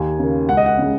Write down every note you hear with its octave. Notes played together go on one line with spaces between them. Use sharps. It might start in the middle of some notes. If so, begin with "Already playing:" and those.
Already playing: D#2 G#5
C#3 A#3
C#2 F#5
D#5
F#5
C#3 G#3